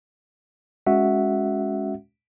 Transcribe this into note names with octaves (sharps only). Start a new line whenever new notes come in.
G#3 C#4 F#4 E5 F#5